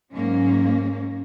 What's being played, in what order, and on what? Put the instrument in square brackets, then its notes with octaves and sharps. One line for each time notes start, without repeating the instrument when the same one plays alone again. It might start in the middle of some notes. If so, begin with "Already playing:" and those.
[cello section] G#2 F#3 A#3 C#4